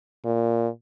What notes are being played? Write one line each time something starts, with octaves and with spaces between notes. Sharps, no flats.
A#2